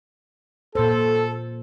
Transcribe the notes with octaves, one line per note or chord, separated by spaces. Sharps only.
A#2 A4 C5